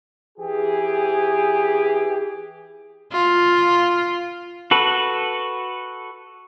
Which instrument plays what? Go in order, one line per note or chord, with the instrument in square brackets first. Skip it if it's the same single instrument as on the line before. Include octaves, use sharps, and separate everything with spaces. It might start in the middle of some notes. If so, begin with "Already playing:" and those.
[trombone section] E3 G4 G#4
[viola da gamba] F4
[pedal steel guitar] F#4 A4 B4